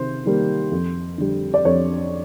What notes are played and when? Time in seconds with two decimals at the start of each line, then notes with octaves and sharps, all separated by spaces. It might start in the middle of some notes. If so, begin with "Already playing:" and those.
Already playing: C3 D#3 C5
0.25 D#3 G3 A#3
0.71 F2
1.18 D3 G3
1.54 D5
1.65 F2 C#5